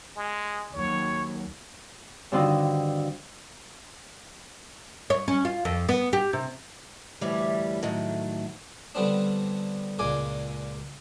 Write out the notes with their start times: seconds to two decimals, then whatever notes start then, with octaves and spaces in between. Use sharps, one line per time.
0.17 G#3
0.74 D#2 F#3 C#5
2.32 G2 D3 D#3 C4 F4 F#4
5.10 C#5
5.28 C#4
5.45 F4
5.65 F2
5.89 B3
6.13 G4
6.33 C3
7.21 D2 A2 E3 G3 C#5 E5
7.83 A2 D#3 F#3 A3
8.95 D3 G3 B3 C4 D4
9.99 C#2 A#2 G#3 D5 G#5 D6